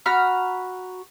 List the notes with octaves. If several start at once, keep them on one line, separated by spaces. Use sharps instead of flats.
F#4 A#5 B5 F6